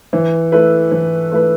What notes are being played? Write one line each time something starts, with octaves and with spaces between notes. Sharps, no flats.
E3
A3 E4 B4
E3
A3 E4 B4